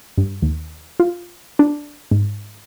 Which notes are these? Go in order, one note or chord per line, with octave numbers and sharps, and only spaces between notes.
G2
D#2
F4
D4
G#2